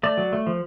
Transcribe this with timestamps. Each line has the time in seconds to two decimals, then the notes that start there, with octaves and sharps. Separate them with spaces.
0.03 A3 D5
0.17 F#3
0.33 A3
0.47 F3